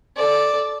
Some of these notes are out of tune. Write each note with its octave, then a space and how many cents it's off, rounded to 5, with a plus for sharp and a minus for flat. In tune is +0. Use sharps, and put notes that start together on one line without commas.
A4 -10 D5 +0